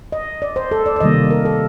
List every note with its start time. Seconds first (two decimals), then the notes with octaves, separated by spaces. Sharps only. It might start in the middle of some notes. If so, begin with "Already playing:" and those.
0.12 D#5
0.42 D5
0.56 C5
0.71 A4
0.86 D5
0.96 D5
1.00 C3 D#3 G3 A#3 D#5
1.31 A#4
1.45 A4